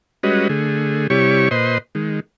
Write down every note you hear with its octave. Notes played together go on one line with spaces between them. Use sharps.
G3 G#3 C#4 F#4 B4 D#5
D3 A3 G#4
C3 G3 E4 G4 C#5 C#6
A#2 B4 C5 D#5 C6
D#3 G#3